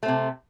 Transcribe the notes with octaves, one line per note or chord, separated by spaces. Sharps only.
C3 A3 C4